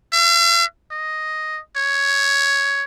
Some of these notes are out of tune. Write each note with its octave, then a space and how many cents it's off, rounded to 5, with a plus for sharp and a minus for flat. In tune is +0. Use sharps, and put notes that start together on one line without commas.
F5 -45
D#5 +0
C#5 +10